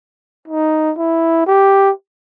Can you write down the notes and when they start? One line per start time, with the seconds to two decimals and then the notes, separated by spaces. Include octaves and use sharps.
0.48 D#4
0.97 E4
1.46 G4